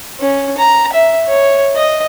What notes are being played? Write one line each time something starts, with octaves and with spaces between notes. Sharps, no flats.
C#4
A#5
E5
C#5
D#5